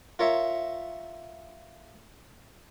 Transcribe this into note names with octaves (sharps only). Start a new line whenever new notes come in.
F4 A#4 C#5 E5